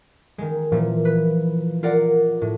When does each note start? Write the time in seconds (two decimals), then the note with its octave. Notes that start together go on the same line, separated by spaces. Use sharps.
0.38 D#3 G#3
0.72 A#2 E3 F3
1.05 B4
1.83 F4 A#4 D5 F#5
2.42 A2